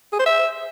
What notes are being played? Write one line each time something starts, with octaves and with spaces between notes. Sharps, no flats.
G#4
C5
E5